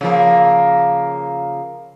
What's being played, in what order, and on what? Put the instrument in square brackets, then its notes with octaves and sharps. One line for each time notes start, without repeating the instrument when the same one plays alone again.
[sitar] C#3 F3 A#3